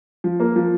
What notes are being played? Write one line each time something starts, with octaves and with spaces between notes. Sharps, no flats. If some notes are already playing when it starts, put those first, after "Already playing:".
F3
A#3
F3